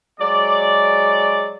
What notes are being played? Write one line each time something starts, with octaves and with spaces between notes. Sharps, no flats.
F#3 G#3 D5